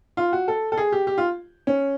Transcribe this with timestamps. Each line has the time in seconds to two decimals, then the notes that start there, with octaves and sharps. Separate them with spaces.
0.17 F4
0.33 F#4
0.48 A4
0.72 A4
0.77 G#4
0.92 G4
1.07 G4
1.18 F4
1.67 C#4